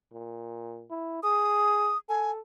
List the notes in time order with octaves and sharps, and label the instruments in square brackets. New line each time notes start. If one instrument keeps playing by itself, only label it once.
[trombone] A#2
E4
[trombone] G#4 [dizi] D#6
[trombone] A4 [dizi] G#5